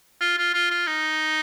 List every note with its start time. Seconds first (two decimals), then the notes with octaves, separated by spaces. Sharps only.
0.21 F4
0.38 F4
0.54 F4
0.70 F4
0.87 D#4